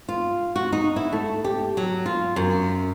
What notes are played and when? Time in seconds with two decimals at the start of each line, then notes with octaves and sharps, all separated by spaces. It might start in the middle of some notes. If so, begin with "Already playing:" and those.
0.09 F4
0.56 F#4
0.73 D#4
0.96 E4
1.12 A3
1.44 G4
1.77 F#3
2.06 F4
2.36 F#2